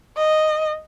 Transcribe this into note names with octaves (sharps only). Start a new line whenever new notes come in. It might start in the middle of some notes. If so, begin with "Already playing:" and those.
D#5